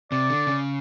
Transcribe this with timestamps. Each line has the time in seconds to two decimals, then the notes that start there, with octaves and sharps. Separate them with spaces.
0.12 C3 D5
0.29 D3
0.47 C#3